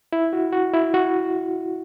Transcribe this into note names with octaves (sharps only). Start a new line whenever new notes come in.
E4
F#4
F#4
E4
F#4